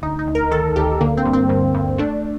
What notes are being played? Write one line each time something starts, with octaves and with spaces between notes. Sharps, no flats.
D2 D#4
D#4
D2
A#4
D#3 A4
D2 G4
D3 A#3
C4
G2
C4
G2
G2
A3 D4